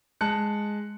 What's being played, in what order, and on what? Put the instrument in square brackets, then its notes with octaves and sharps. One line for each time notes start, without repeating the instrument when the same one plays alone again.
[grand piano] G#3 A5 F#6 C#7